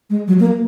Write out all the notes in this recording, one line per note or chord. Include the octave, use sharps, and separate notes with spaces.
G#3
F#3
A#3